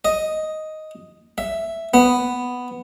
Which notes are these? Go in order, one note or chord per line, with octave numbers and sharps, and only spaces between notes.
D#5
E5
B3